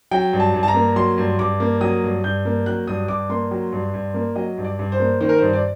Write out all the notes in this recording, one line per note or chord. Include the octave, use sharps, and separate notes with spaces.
F#3 G5
G2
A5
G2
A5
A#5
A#3
F#3 C6
G2
G2 D6
A#3
F#3 D#6
G2
G2 G6
A#3
F#3 F#6
G2 D#6
G2 D6
A#3 C6
F#3
G2
G2
A#3
F#3 D#5
G2
D5
G2
C5
A#3
D#3 C5
A#4
G2 C5
D5